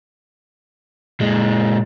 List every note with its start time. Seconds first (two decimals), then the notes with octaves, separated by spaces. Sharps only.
1.20 A#2 G#3